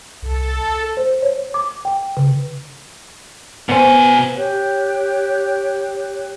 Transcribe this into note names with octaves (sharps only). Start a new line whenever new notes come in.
C2 A4
C5
C#5
D6
G5
C#3
B2 B3 C5 G#5
G4 C#5 F#6